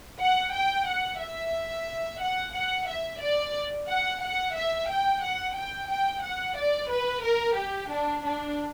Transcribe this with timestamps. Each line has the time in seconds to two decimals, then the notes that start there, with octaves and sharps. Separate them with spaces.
0.20 F#5
0.53 G5
0.87 F#5
1.20 E5
2.21 F#5
2.54 F#5
2.87 E5
3.21 D5
3.88 F#5
4.22 F#5
4.55 E5
4.89 G5
5.22 F#5
5.56 G5
5.89 G5
6.23 F#5
6.57 D5
6.90 B4
7.24 A#4
7.57 G4
7.91 D4
8.24 D4